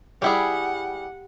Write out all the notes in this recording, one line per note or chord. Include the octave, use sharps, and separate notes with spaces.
G3 E4 G4 G#4 F#5 G5 B5